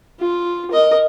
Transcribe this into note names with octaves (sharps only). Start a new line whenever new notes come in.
F4
A#4 D#5